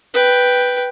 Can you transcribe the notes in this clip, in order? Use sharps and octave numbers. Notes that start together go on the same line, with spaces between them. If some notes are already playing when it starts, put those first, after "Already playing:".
B4 G5